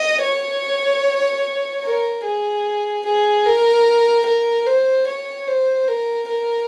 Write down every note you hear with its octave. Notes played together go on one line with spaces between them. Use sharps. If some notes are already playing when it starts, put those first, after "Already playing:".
Already playing: D#5
C#5
A#4
G#4
G#4
A#4
A#4
C5
C#5
C5
A#4
A#4